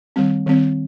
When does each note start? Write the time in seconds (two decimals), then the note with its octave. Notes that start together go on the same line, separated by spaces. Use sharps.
0.16 D#3 G3 C4
0.46 D#3 G3 C4